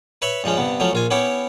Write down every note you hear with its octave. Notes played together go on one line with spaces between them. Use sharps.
B4 C#5 E5 B5
G2 F3 G#3 C#4
G2 C3 B3
F3 F#3 A3 C#4
A#1 F4 G#5
B3 C#4 E4 G4 C#5